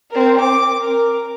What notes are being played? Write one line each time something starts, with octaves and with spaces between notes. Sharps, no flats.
C4 A#4
D6
A#4